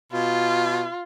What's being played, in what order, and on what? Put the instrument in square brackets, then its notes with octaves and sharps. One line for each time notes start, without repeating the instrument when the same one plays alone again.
[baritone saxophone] B2 [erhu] F4